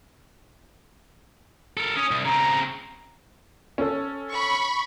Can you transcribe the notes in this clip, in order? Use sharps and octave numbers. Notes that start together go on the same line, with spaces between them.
A4 A#4
C#4 D#6
C2
C#3 C4 A#5
C#4 A4
B5 C#6